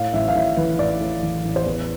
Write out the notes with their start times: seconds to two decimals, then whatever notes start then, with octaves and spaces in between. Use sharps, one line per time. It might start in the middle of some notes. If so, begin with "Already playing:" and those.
Already playing: A2 F5
0.13 A1 E5
0.28 F5
0.35 A2 E5
0.57 E3 B4
0.79 A1 D5
1.01 A2
1.23 E3
1.45 A1
1.56 C5
1.66 E2 B4